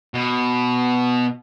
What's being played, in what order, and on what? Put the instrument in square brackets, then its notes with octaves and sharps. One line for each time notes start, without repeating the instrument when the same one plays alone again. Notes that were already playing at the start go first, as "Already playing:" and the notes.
[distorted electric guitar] B2